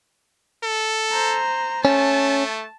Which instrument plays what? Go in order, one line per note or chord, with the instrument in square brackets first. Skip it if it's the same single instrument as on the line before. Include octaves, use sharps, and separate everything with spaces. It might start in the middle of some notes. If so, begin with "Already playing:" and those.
[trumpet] A4
[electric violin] C5 A#5
[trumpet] A3 [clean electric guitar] C#4 [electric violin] A5